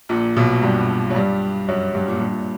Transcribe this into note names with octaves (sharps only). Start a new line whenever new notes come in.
A#1 A#2
B1 B2
G2 G3
F#3
G2 G3
F#2 F#3
G2
A#2
G2
A#2